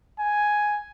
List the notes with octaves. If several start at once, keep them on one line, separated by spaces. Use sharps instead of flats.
G#5